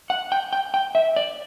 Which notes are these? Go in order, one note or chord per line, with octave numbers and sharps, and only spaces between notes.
F#5
G5
G5
G5
E5
D5